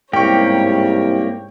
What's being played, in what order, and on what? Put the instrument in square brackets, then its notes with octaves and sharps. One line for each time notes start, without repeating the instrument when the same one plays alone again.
[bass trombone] C2 [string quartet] G#2 C#3 C#5 [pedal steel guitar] A#3 G4 [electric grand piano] G5 C#6